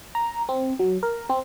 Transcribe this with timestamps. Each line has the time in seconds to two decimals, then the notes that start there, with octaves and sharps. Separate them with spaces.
0.15 A#5
0.49 C4
0.79 F#3
1.03 A#4
1.30 C4